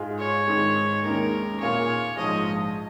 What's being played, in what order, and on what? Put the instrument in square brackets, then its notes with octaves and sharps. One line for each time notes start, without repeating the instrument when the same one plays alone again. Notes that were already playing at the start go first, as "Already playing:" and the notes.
Already playing: [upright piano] G#2 G#3 F4 G#4
[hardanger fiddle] C#5
[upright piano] G#2 D#3 G#3
[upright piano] D#2 D#3 G#3 C#4 [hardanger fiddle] A#4
[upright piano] A#2 A#3 F4 G#4 [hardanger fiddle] C#5
[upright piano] A#1 G#2 F3 G#3 [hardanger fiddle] D#5